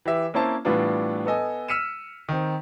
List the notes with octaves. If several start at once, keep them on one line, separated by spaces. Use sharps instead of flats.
E3 G4 E5
A#3 C4 C#4 E4 C5 A5
A2 E3 G3 B3 D4 F4
B3 A4 D#5 G#5
E6 F6 B6 C#7 D#7 E7
D#3 C4